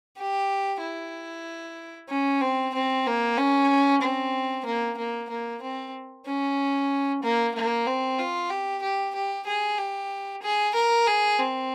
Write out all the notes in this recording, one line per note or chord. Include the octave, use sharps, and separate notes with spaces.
G4
E4
C#4
C4
C4
A#3
C#4
C4
A#3
A#3
A#3
C4
C#4
A#3
A#3
C4
F4
G4
G4
G4
G#4
G4
G#4
A#4
G#4
C4